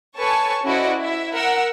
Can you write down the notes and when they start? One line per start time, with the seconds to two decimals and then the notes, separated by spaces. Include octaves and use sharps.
0.18 A4 B4 C#5 G#5 A5 C#6
0.65 C#4 E4 F#4 C5 D5 D#5
1.00 E4 E5
1.33 A#4 F#5 E6